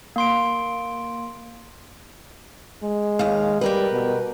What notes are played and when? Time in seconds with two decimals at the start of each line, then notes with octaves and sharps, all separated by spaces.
0.16 A#3 C6 D7
2.83 G#3
3.19 D#2 F5
3.61 G3 G4 A#4 B4
3.92 B2